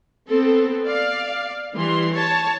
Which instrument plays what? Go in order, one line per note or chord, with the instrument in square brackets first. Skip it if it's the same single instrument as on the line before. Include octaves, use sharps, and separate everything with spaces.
[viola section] B3 C4 A4
D5 F5
E3 G3 C6
C#5 A5